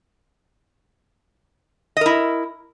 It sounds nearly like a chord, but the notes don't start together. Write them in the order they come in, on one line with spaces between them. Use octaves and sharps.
D#5 A#4 E4